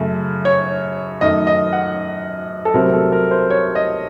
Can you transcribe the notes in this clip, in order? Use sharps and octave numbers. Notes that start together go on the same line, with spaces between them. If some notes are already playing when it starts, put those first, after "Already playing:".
Already playing: F#2 C#3 A3
C#5
F#2 D#3 A3 D#5
D#5
F#5
A4
C2 C3 F#3 A3 C4 A#4
A4
A#4
C5
C#5
D#5